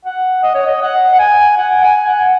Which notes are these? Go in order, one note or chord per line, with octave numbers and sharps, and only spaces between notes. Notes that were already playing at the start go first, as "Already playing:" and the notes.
F#5
D#5
C#5
D#5
F#5
F#5
G#5
F#5
G#5
F#5